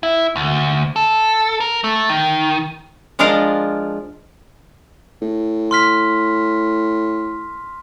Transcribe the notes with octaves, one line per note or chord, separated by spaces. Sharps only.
E4
D2
A4
A#4
A3
D#3
F3 G#3 D4 F4 A#4 F5
A2
C6 F6 B6